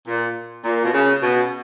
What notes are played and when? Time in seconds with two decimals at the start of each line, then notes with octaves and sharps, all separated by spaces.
0.07 A#2
0.65 A#2
0.85 B2
0.94 C#3
1.22 B2